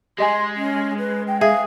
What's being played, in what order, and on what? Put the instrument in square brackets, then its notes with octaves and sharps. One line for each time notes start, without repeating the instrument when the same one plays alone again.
[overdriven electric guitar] G#3 [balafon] G4 D#5 G#5 [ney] C6
[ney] C#4
B4
G5
[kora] G#4 [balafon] E5 [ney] F5